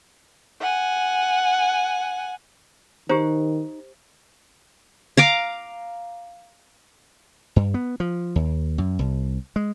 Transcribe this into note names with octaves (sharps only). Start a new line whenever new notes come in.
F#5 G#5
D#3 D#4 G4 C5
F5 A#5 D6
G2
B3
F3
D#2
F#2
C2
G#3